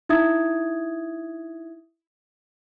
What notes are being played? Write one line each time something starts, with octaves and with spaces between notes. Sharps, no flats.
D#4 E4 E5 D#6 G#6